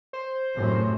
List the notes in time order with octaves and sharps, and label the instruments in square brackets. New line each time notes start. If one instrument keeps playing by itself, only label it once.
[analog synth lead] C5
[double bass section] F#2 A2 C3